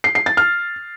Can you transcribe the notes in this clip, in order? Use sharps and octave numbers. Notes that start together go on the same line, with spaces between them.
C7
C7
A6
F6